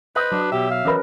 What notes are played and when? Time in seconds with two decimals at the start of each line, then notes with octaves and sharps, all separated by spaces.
0.16 B4 C5 D#5
0.32 F#3 D4
0.52 B1 B2 G4 E5
0.71 F5
0.85 E3 C#4 A#4 B4 D#5 B5